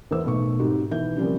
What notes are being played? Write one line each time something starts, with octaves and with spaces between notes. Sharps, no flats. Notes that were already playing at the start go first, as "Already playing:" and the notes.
E2 E3 C5 E6
B1 B2 A3 C#6
G#2 C4 F#4 G4
B2 D#3 E3 E5 G6
C#3 F3 G3 A#3 C4 C#4